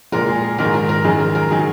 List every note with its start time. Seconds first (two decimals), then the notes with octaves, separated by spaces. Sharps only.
0.12 A#2 G#3 A#4
0.28 G#4
0.44 G#4
0.58 G#2 D#3 G#3 A#4
0.74 A#4
0.89 A#4
1.04 F#2 D#3 G#3 G#4
1.20 A#4
1.35 A#4
1.50 D#3 F#3 G#4